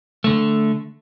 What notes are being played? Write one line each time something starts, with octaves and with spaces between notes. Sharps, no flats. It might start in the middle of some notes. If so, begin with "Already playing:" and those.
D3 A3